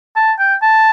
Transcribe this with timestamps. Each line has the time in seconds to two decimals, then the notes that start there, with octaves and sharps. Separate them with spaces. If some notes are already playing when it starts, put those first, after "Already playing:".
0.16 A5
0.39 G5
0.62 A5